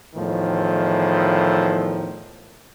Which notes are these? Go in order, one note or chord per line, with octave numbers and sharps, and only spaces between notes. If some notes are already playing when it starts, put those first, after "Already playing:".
E2 A2 D#3 F3